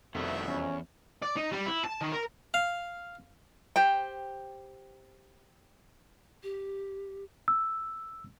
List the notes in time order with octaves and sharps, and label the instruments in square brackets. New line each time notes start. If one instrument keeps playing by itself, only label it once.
[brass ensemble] C2 B2 E5 [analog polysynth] F2 [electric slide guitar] D#3 A3 D4
[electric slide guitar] E2 [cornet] C#4
[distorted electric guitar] D5
D#4
G3
E4
A5
D#3
A#4
[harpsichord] F5
[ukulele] G4 C5 G5
[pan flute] G4
[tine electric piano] E6